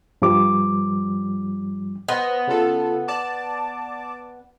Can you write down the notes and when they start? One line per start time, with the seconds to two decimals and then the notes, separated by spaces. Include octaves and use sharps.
0.22 G2 F3 G3 D6
2.08 B3 B4 C5 D#5
2.47 C#3 F4 A4
3.08 D5 A5 D6